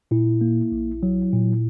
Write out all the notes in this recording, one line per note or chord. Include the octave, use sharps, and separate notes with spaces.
A#2 E4
A#3
A#1
F#3
A#2